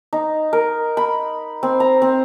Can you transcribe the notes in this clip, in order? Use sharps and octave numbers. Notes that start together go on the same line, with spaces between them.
D#4
A#4
B5
C4
A#5
C4